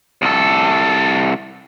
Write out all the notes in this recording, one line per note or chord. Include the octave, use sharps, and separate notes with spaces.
C2 A4